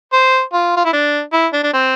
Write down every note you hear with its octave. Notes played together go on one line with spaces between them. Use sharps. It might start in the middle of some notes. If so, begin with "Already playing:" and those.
C5
F4
F4
E4
D4
E4
D4
D4
C4